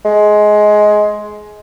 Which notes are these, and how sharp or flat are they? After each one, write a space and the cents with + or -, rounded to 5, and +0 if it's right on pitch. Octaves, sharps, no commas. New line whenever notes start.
G#3 +15